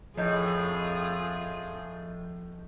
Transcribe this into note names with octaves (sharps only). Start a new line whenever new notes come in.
F2 A2 F3 F4 G#4 D#5 G6